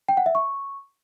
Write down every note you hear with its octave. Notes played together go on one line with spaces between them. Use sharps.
G5
F#5
E5
C#6